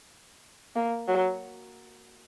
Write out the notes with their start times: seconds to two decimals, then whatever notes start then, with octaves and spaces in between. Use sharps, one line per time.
0.76 A#3
1.08 F#3